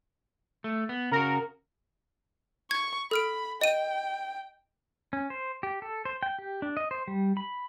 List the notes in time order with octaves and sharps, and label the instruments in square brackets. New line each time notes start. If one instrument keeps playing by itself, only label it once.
[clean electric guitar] A3
B3
[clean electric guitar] C#3 F#4 [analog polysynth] A#4
[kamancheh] C#6 [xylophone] G#6
[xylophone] A4 F6 D7 [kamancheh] B5
[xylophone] D#5 D#7 [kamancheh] G5
[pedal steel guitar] C#4
C5
G4
A4
C5
G5
G4
D4
D#5
C5
G3
B5